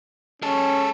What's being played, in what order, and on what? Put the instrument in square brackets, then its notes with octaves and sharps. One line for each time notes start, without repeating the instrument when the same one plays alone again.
[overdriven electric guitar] G#3 A4 [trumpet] C#4